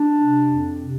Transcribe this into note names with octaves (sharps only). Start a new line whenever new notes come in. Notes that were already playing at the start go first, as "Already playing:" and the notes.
Already playing: D4
C3
F2
C3